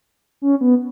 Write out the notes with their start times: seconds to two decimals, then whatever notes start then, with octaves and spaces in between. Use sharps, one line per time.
0.42 C#4
0.61 B3